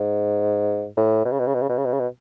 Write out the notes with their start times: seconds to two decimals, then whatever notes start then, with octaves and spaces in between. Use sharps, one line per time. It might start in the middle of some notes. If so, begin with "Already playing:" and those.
Already playing: G#2
0.97 A2
1.25 B2
1.32 C#3
1.39 B2
1.47 C#3
1.54 B2
1.62 C#3
1.69 B2
1.77 C#3
1.85 B2
1.92 C#3
2.00 B2